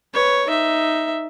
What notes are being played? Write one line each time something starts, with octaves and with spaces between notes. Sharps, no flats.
B4 C#5
D#4 E5